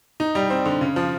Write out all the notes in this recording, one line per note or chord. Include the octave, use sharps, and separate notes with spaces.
D#4
G3
C4
D3
C#3
F3